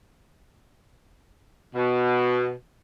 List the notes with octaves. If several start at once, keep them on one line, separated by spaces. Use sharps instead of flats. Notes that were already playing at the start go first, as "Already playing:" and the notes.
B2